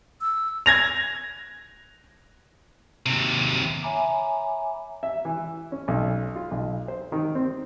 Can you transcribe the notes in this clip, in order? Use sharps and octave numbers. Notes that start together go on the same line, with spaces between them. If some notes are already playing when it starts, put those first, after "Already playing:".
E6
G#6 A#6 F7
D#2 C3
C#5 E5 G#5 A#5 B5 D6
E5
E3
C#4
B1
F4
B1
C5
D#3
C4